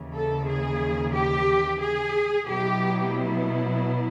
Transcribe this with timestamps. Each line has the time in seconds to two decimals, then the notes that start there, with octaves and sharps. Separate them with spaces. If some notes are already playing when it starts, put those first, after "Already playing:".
Already playing: D#2 C#3 E3
0.15 A4
0.48 G#4
1.15 G4
1.82 G#4
2.49 B2 F#3 B3 E4 G4